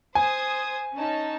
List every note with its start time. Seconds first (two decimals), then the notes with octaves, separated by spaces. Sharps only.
0.15 C5 G#5 D#6 G#6
0.94 C#4 D#4 A5